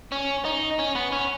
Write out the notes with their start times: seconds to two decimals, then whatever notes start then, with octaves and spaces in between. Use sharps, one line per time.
0.12 C#4
0.45 D#4
0.79 C#4
0.95 B3
1.12 C#4